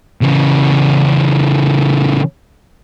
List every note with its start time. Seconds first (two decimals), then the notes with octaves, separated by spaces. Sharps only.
0.21 C#3 E3